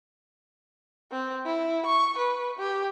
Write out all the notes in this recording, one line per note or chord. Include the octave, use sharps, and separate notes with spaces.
C4
E4
C#6
B4
G4